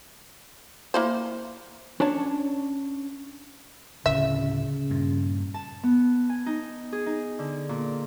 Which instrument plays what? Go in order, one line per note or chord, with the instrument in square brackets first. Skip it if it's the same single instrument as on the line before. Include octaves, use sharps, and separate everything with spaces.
[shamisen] A#3 E4 C5
[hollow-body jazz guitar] C#4 D4 C#5 A5
[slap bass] D1 [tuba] C#3 [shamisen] E5
[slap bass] G2 A#2
[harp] A5
B3
G#5
D#4
G#4
D#4
D3
A#2